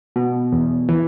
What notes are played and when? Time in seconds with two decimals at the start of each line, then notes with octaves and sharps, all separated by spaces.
0.16 B2
0.52 E2
0.89 E3